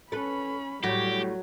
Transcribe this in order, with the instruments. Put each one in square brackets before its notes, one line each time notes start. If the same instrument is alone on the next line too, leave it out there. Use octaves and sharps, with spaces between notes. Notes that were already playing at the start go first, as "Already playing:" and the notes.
[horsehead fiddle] C#4 B5 [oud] A4 B4
[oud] A2 [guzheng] F#3 [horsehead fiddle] G3 [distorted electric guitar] G4